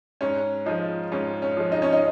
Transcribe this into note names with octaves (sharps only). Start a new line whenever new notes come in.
G#2 C#4
F3 G#3 D#4
G#2 C#4
C#4
F3 G#3
D#4
C#4
D#4